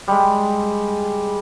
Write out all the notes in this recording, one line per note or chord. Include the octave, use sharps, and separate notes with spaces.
G3 G#3